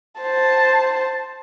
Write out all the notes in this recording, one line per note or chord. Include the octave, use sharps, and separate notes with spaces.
C5 A5